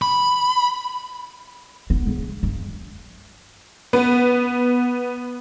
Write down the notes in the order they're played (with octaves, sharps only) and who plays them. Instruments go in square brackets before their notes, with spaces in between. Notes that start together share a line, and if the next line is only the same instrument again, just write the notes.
[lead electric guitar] B5
[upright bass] B3
C#3
G2
[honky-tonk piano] B3